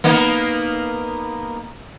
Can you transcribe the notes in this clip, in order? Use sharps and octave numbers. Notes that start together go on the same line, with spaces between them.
A#3 B3 D#4